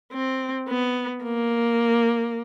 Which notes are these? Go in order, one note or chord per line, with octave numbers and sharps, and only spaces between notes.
C4
B3
A#3